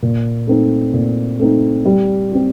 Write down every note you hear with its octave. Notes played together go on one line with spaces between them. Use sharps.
A#2
A3 C4 D#4
A#2
A3 C4 D#4
G3
C4 G4